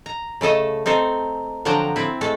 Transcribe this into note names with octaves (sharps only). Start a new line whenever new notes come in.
A#5
C#3 A3 A4 D#5 A5
C4 D#4 A4 C5
D3 F3 F#3 G5 A5 A#5
C4 E4
G#3 A3 A4